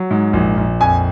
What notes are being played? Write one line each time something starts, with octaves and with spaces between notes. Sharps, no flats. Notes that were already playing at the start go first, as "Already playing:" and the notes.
Already playing: F#3
G#2
A#1
A#1
F2 G#5